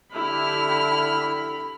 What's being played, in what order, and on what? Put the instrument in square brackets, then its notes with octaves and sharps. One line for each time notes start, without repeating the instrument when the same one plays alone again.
[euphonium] D3 [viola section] E4 G4 [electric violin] B5 [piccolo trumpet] F6